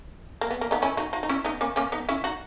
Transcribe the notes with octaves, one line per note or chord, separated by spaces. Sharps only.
A#3
B3
A#3
B3 D#4
C#4 E4
D#4 F#4
D#4 F#4
D#4
C#4 E4
B3 D#4
A#3 C#4
A#3 C#4
B3 D#4
C#4 E4
D#4 F#4